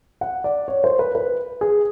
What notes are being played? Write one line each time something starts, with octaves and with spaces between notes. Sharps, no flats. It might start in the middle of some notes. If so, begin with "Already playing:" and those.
F#5
D5
C#5
C5
B4
B4
G#4